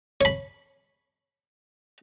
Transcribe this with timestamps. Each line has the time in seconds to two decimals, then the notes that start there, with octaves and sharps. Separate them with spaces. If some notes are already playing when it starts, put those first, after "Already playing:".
0.21 C#5 B5